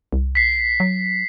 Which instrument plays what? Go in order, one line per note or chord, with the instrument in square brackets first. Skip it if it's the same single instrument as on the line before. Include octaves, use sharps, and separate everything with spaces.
[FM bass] C2
[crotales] B6 C7
[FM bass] F#3